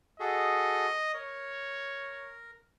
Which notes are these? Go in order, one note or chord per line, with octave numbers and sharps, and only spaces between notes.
F#4 G#4 A4 D#5
A#4 C#5